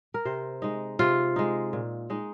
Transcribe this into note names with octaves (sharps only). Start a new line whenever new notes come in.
A#4
C3 C5
G#3 D#4
C3 F4
G#3 D#4
A#2
G#3 D#4